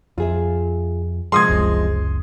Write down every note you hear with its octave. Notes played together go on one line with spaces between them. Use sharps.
F2 F4 G#4 E5
C3 F3 G#3 C6 D#6 G#6
F#1 C#2